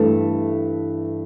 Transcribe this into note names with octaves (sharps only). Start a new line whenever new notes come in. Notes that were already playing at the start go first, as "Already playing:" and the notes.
Already playing: G2 E3 A3 A4 A5